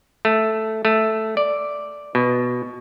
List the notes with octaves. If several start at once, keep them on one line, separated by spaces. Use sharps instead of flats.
A3
A3
D5
B2